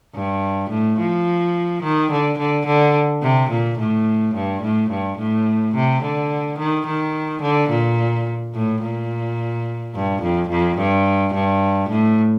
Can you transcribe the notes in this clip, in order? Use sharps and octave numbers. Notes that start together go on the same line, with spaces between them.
G2
A2
F3
D#3
D3
D3
D3
C3
A#2
A2
G2
A2
G2
A2
C3
D3
D#3
D#3
D3
A#2
A2
A#2
G2
F2
F2
G2
G2
A2